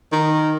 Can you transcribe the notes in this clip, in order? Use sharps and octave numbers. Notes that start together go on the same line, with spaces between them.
D#3